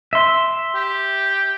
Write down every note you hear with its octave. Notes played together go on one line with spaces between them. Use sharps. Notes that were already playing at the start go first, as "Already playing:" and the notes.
E5 C6
G4